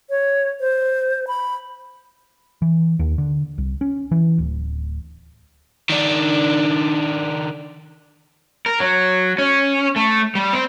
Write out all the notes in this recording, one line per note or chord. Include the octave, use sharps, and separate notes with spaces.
C#5
C5
B5
E3
D#2
D3
C2
C#4
E3
D1
D#3 D4
A#4
F#3
C#4
A3
G3
C4